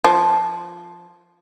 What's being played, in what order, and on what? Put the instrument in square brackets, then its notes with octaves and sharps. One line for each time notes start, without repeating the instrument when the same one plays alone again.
[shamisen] F3